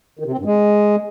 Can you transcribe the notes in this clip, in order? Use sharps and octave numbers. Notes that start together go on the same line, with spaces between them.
D#3
C3
C4
G2
G#3